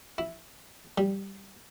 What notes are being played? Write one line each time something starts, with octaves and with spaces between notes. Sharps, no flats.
E4
G3